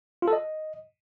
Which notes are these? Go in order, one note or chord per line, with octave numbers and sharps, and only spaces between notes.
F4
A4
D#5